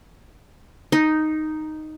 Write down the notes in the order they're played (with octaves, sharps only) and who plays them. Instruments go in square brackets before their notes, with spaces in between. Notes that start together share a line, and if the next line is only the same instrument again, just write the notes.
[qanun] D#4